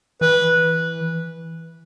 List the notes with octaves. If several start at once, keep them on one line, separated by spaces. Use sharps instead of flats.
E3 B4